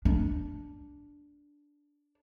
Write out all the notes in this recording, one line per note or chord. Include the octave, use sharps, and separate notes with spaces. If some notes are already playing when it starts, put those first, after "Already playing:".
D4